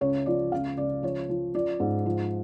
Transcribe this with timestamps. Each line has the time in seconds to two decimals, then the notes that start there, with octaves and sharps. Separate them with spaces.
0.01 C#2 C#5
0.26 F3 D5
0.52 C#2 F5
0.77 C#2 D5
1.03 F3 C#5
1.29 F3
1.54 F3 D5
1.80 G#2
2.06 F3